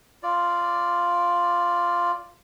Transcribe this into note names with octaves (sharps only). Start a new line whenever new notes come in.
F4 D5